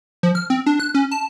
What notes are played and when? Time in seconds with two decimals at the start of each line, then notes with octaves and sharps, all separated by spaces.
0.23 F3
0.35 F6
0.50 C4
0.66 D4
0.80 F#6
0.95 C#4
1.11 A5